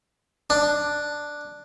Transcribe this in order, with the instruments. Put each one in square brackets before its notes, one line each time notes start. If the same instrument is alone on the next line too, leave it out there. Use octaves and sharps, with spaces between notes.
[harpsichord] D4